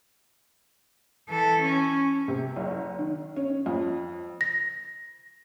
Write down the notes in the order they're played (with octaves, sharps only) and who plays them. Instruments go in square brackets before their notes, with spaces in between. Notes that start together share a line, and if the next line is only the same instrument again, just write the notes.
[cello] E3 A4
C#4
[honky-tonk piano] C3
F#1
D#3
C#4
F2
[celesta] A#6